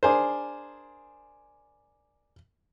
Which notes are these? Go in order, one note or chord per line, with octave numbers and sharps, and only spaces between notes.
D4 G#4 A#4 C5